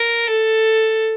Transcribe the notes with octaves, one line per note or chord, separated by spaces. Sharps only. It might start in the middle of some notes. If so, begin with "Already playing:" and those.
Already playing: A#4
A4